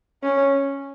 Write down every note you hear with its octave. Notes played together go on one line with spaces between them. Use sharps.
C#4